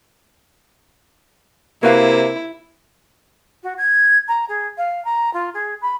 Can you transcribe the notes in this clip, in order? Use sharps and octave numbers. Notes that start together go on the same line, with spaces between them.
C3 A#3 E4 F#4 B4 F5
F#4
G#6
A#5
G#4
F5
A#5
F4
G#4
B5